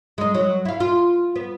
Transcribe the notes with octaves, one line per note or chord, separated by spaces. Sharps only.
G#3 D#4
F#3
E4 F5
F4
B3